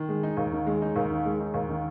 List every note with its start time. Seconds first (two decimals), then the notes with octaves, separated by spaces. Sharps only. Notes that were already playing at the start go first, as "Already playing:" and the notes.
Already playing: D#3
0.09 G#3
0.23 D#4
0.37 D#2
0.53 D#3
0.67 G#3
0.82 D#4
0.96 D#2
1.11 D#3
1.26 G#3
1.40 D#4
1.54 D#2
1.70 D#3